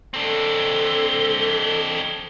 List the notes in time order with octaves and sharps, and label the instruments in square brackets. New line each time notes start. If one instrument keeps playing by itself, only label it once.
[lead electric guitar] C4 D4 [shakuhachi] A4 [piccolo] G7